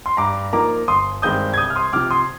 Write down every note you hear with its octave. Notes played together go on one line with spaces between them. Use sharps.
C6
G2 A#5 D6
F3 A#3 D#4 A#5 D6
G1 C6 D#6
G2 D#3 G#3 C4 D#6 G6
G#6
C2 D#6 G6
F6
C6 D#6
C3 F3 D6 F6
C6 D#6